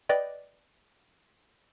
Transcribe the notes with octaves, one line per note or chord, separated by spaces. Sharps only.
B4 D5 D#5 G5